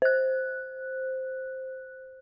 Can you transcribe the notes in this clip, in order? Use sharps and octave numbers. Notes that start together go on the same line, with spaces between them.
C5 F#6